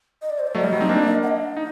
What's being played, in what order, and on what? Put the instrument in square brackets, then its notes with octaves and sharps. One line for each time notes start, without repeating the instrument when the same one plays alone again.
[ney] D#5
D5
C5
D5
[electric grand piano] F#3 A3 [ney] D#5
[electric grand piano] G3
F#3
C4 D#4
A#3 D4
[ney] F#5
D#5
[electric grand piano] D#4